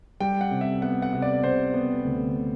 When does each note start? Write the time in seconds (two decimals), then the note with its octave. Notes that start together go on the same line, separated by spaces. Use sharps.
0.20 G3 G5
0.41 F#5
0.51 C3
0.61 E5
0.82 B3 F#5
1.02 F#5
1.13 C3
1.22 D5
1.43 C3 C5
1.74 B3
2.04 D2